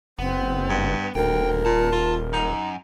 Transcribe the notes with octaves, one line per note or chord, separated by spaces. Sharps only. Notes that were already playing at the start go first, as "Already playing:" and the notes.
F#1 B3 C4
G2
D#1 D2 A#4 G5
A#2 A5
F4
F#2 D#4